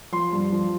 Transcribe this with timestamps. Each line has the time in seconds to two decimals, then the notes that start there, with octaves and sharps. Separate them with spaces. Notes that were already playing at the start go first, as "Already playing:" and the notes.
0.12 F3 C6
0.32 G2
0.52 F3